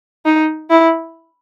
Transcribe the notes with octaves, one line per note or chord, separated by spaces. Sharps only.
D#4
E4